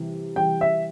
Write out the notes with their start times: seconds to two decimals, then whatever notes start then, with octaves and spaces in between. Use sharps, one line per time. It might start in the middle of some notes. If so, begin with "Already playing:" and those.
Already playing: C3 E3 G3
0.36 C3 E3 G3 G5
0.61 E5